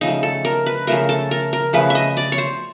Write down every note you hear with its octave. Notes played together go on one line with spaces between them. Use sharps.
C#3 F3 A3 D#4
A4
A#4
B4
C#3 F3 A3 A#4
A4
A#4
A#4
C#3 F3 A3 B4
D#5 E5
D5
C#5
C5